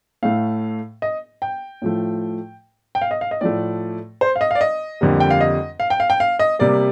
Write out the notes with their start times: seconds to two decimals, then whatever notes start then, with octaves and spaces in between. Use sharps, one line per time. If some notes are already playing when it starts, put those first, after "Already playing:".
0.23 A2 A3 F5
1.02 D#5
1.42 G5
1.82 A2 F3 A3
2.95 G5
3.02 F5
3.11 D#5
3.21 F5
3.31 D#5
3.41 A2 F3 A3 D5
4.21 C5
4.36 F5
4.41 D#5
4.51 F5
4.55 D5
4.61 D#5
5.01 F2 D3 G3 A#3
5.20 G5
5.31 F5
5.41 D#5
5.80 F5
5.90 G5
6.00 F5
6.10 G5
6.20 F5
6.39 D#5
6.59 C3 G3 A#3 D5